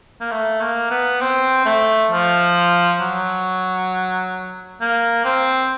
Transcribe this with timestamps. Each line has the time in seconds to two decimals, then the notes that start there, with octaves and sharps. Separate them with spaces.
0.21 A#3
0.31 A3
0.61 A#3
0.91 B3
1.21 C4
1.65 A3
2.11 F3
3.00 F#3
4.81 A#3
5.25 C4